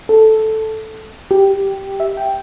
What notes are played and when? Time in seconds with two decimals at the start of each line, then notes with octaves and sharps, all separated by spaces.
0.09 A4
1.31 G4
2.00 E5
2.17 G5